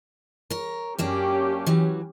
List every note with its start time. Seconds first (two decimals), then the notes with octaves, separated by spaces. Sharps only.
0.50 A#4 C#5
0.99 F#2 A#3 C#4 D4 G4
1.67 E3 F#3